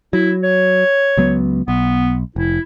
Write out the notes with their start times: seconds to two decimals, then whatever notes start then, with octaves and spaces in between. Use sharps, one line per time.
0.13 F#3 E4
0.43 C#5
1.17 C#2 F#3 B3
1.68 B1 B3
2.36 F1 E4